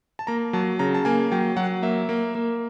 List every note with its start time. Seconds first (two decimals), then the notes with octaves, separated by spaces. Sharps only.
0.19 A5
0.27 A#3 A#5
0.53 F#3 A5
0.79 C#3 A#5
0.95 A5
1.05 A#3 G#5
1.32 F#3 G5
1.57 F#3 F#5
1.82 A#3 E5
2.09 A#3
2.35 A#3